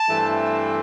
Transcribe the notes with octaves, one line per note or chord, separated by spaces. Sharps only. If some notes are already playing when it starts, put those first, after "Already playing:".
Already playing: A5
G2 E3 A3 C4